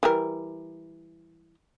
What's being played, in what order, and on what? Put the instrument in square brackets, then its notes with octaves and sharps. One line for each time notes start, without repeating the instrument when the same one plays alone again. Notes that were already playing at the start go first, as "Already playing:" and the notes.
[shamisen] E3 G3 A#4